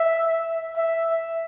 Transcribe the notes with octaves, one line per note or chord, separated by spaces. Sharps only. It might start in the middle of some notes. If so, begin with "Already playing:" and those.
Already playing: E5
E5